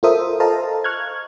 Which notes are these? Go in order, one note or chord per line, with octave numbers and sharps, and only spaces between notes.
F4 A4 A#4 C5 E5 D#6
A4 C5 D#5 F5 A5 A#5
C#6 F6 F#6 G#6